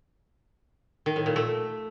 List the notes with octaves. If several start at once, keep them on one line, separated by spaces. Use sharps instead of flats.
D#3
A2
A#2
A3